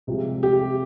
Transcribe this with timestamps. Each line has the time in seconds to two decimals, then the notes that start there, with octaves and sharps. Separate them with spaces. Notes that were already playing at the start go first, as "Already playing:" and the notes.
0.07 C2 C3 F3 G#3
0.43 G4